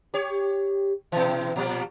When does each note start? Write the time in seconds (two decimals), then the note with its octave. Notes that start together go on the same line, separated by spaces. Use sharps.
0.14 G4 C#5
1.12 B2 E3
1.56 A#2 F3 G3